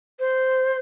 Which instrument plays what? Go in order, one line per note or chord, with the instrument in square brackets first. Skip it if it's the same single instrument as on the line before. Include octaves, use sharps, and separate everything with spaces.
[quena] C5